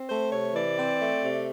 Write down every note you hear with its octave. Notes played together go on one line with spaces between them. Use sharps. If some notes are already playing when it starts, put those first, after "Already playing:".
Already playing: C4
A3 C5
C3 C#5
E3 D5
C4
A3
C3